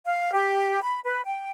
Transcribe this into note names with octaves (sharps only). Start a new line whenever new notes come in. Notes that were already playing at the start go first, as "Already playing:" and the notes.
F5
G4
B5
B4
G5